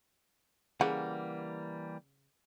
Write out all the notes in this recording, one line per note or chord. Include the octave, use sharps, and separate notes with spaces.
C#3 E3 G3 A#3 F#5